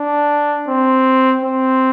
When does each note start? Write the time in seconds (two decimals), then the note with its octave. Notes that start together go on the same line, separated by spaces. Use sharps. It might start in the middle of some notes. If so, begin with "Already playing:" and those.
Already playing: D4
0.68 C4
1.43 C4